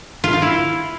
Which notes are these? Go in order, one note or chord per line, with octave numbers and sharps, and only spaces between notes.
F4
F5
E4